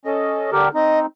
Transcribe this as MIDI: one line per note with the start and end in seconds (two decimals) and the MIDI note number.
0.05 0.50 61
0.05 0.71 69
0.05 0.50 75
0.52 0.69 50
0.52 0.69 67
0.52 0.69 70
0.74 1.06 60
0.74 1.06 63
0.74 0.99 75